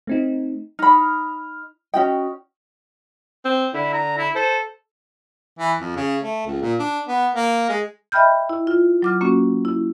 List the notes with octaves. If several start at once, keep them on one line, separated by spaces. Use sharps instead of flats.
A3 C4 D#4
D#4 B5 F6
C#4 F#4 D#5 G5
C4
D3 E4
A#5
E4
A4 C5
E3
F2
C#3
A3
C#2
A#2
D4
B3
A#3
G#3
D#5 E5 G5 B5 F6 G6
E4
F4
F#3 D6 F6
A#3 C#4 F#4
E4